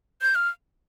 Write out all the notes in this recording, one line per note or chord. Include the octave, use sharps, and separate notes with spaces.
G6
F6